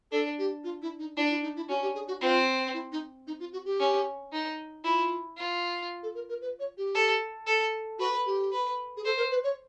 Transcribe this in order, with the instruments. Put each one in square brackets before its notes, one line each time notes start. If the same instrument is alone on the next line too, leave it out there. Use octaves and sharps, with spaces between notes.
[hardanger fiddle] D4 [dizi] A4
[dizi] G4
F4
E4
D#4
[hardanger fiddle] D4 [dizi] E4
[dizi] E4
D#4
E4
[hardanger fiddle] C#4 [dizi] F#4
[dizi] G4
G#4
F#4
[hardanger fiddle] C4 [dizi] F4
[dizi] E4
D#4
D#4
F4
F#4
G4
[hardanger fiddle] C#4
D#4
[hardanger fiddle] E4 [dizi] F4
[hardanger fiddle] F4
[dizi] A4
A#4
A#4
B4
C#5
G4
[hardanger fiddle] A4
A4
[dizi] F#4 [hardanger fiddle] B4
[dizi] G4
[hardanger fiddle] B4
[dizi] G#4
[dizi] A4 [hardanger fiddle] C5
[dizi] A#4
B4
C#5